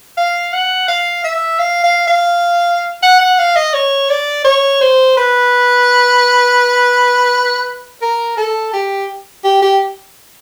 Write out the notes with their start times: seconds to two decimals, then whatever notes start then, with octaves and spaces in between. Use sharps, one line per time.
0.17 F5
0.53 F#5
0.88 F5
1.24 E5
1.59 F5
1.84 F5
2.07 F5
3.03 F#5
3.20 F#5
3.39 F5
3.56 D#5
3.74 C#5
4.09 D5
4.45 C#5
4.81 C5
5.17 B4
8.02 A#4
8.37 A4
8.73 G4
9.44 G4
9.62 G4